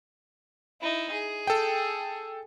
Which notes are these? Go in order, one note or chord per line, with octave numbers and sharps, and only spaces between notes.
D#4 E4
G#4
A4 G5